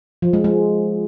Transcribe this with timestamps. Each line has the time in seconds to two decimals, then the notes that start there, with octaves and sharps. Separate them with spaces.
0.22 F3
0.33 G#3
0.44 G#3